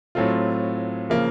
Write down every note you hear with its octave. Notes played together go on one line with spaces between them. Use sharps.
A2 F#3 A3 C4 F4
C#3 F3 A#3